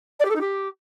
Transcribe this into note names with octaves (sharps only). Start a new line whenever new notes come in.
D5
G4
A4
D#4
G4